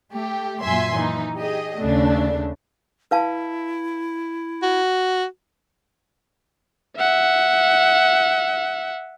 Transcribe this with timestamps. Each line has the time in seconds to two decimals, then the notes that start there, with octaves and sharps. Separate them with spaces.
0.12 A3 G4
0.62 F#2 A#2 F#3 E5 G#5 C6
0.96 E3 D#4
1.37 G4 G#4 D#5
1.79 D#2 C#3 A3 D4
3.11 E4 B4 F5 A5
4.62 F#4
6.98 E5 F#5